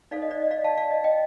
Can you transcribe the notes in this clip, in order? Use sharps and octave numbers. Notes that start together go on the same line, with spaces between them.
D#4 A4 C5 D5 F5
D#5
D5
D#5
D5 F5
F5 A5
D5 F5
D#5
D#5 G5